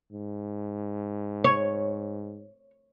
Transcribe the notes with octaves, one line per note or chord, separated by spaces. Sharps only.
G#2
C#5